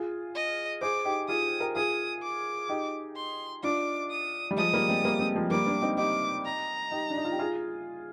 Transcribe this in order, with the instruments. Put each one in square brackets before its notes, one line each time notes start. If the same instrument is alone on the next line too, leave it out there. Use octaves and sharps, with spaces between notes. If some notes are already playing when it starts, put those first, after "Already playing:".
Already playing: [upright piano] F4 G#4
[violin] D#5
[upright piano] G#4 C5 [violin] D6
[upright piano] D#4 G4
[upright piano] F4 G#4 [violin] D#6
[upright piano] G4 A#4
[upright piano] F4 G#4 [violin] D#6
[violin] D6
[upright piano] D#4 G4
[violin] C6
[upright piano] D4 F4 [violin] D6
[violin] D#6
[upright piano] G3
[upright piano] F3 G#3 [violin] D#6
[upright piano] G3 A#3
G#3 C4
G3 A#3
G#3 C4
F3 G#3
[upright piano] G3 A#3 [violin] D6
[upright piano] A#3 D4
C4 D#4
[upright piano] D#4 G4 [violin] D6
[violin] A#5
[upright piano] D#4 G4
D4
D#4
F4
G4
F4 G#4